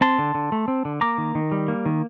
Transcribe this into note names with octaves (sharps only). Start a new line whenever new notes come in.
C4 A5 C6
D3
D3
A3
C4
D3
A#3 A#5 D6
D#3
D#3
G3
A#3
D#3